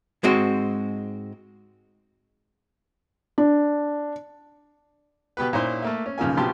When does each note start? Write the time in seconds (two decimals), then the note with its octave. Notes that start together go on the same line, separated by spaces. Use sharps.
0.23 G#2 G#3 C4 F#4
3.38 D4
5.37 B2 B3 G4 B4
5.53 A#2 C#4 D#4 E4 C5 C6
5.82 A3 A#3 E5
6.06 C#4
6.18 B1 C#3 F3 A#3 G#5
6.37 A#1 B2 F3 G4 A5 C6